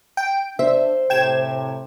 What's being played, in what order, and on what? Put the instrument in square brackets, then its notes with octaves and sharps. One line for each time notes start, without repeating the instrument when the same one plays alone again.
[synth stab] G5 D7
[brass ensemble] D4 [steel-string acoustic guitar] C5 [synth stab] E5
[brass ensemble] A2 C3 [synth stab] G5 G#6 E7